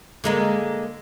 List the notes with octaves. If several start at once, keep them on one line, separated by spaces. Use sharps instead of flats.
D3 G#3 A#3